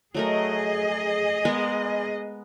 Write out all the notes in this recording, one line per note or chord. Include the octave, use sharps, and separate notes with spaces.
F#3 A3 G#4 A#4 D#5
G#3 B3 A#4